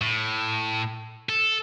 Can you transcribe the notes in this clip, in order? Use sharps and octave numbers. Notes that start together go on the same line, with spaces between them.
A2
A4